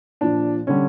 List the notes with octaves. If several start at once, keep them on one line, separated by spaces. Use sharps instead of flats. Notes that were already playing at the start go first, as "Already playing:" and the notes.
A#2 F3 D4
D3 G3 C#4